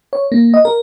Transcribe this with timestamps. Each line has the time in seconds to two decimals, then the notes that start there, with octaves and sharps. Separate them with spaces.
0.13 C#5
0.32 A#3
0.54 D#5
0.65 A#4